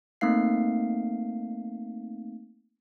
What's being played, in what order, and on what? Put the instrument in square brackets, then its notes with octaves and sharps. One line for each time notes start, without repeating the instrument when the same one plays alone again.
[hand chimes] A3 A#3 C4 D#4 F5 C7